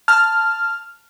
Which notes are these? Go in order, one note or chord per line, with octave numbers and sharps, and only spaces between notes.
A5 F6